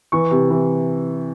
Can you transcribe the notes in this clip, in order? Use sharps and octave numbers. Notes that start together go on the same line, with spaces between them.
E3 C#6
C3
E3